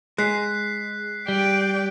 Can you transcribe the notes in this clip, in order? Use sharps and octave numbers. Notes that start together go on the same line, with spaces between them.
G#3 F#6 B6 C7
G3 D5 G5